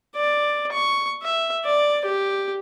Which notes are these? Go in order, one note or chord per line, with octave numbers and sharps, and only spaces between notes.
D5
C#6
E5
D5
G4